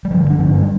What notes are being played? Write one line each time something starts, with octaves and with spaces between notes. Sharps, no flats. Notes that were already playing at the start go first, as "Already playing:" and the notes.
G3
G2 D3 F3
D4
G2 D3 C4
A3
G3